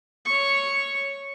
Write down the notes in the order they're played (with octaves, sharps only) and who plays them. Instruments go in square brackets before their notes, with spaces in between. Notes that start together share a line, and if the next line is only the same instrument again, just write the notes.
[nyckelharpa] C#5 C#6